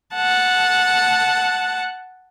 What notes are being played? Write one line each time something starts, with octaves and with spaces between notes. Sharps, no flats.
F#5 A5